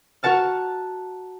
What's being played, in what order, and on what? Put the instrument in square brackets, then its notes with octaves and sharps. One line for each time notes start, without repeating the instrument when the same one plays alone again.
[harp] F#4 A#4 F#5 A5 F6